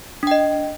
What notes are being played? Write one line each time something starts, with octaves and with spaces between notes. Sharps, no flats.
D4 D#5 G5